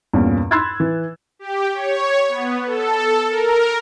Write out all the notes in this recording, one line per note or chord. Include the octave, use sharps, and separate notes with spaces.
E2 G2 A#2 C#4
B5 C6 E6 F#6 G#6 A6
E3
G4
C#5
B3
A4
A#4